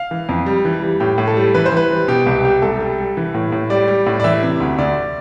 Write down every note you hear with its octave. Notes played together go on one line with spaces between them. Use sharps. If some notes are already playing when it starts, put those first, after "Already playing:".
Already playing: F5
E3
F2
G3
E3
G3
A2 G4
A2
A4
G3
E3 B4
C5
E3 B4
G3
B2 G4
C2 G4
G3 G4
C2 A4
G3
G3
E3
A2
A2
G3 D5
G3
A2
D5
E3 E5
C3
D2
D2 D5